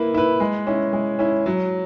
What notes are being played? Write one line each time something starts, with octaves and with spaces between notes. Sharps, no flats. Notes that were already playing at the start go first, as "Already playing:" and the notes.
Already playing: A#3 E4 B4
E4 B4
G#3
C#4 E4
G#3
C#4 E4
F#3